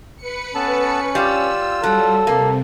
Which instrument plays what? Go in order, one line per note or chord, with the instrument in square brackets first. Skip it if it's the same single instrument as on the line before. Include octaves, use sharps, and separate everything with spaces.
[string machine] B4 C#7
[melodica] B3 A4 A5 [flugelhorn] C#4
[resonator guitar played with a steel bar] G3 [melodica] F4 [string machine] E6
[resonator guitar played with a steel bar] F#3 [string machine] G3 [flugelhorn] A4
[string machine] C3 [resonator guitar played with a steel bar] A#3